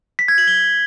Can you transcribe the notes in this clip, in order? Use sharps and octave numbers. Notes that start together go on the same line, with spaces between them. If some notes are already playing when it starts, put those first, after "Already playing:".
B6
G#6
F#7
G7